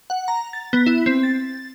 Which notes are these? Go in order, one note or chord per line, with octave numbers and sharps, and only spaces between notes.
F#5
A#5
A6
B3
E4
C4
A6